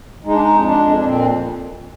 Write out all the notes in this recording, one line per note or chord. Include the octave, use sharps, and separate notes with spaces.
G#3 D#4
D4
D#4
F2
D#4
D4
F2
D4
A#2 C4